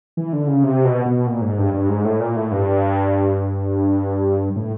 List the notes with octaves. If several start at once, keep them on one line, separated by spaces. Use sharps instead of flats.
E3
D3
C#3
C3
B2
B2
A#2
G#2
G2
G2
G#2
A2
A#2
A2
G2
A2